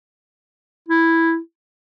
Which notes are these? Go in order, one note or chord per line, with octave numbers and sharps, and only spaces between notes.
E4